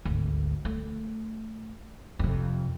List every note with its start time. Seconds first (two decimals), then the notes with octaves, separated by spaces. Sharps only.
0.05 G#1 D2
0.65 A3
2.19 F2 C3